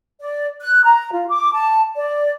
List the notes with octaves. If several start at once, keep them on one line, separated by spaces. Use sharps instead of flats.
D5
F#6
A#5
F4
D6
A5
D5